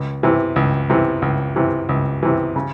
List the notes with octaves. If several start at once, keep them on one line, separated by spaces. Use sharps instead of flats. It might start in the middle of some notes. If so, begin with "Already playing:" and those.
Already playing: C#2
C3 E3
C#2
C3 E3
C#2
C3 E3
C#2
C3 E3
C#3